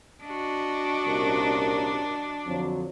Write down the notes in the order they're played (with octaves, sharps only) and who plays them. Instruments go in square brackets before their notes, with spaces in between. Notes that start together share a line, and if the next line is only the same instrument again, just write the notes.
[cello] D4 [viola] F#4 D#5
[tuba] C2 [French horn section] A#2 C#4 A#4
[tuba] F2 [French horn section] D3 F3 F#3